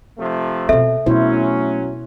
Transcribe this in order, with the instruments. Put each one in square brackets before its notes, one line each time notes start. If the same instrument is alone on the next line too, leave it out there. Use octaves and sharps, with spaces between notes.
[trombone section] C3 F3 A3
[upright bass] B2 C4 [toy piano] A4 E5
[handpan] B2 E4 C5 [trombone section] F#3 C#4 [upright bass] A3